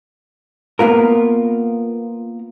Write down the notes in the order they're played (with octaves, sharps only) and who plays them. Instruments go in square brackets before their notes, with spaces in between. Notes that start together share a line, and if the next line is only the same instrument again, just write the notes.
[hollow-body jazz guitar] A#3 B3 F4 A#4